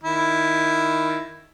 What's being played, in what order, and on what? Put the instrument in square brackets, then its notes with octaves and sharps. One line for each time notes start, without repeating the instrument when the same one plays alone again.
[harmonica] D#3 E4